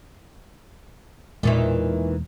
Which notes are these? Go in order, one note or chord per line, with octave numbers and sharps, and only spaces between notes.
E1 E2 A#2 D#3 E3 G#3